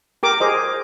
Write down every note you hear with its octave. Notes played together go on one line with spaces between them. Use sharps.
G4 A#4 D6
G#4 C5 D#5